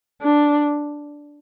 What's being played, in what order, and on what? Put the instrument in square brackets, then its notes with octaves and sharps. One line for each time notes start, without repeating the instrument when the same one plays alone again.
[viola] D4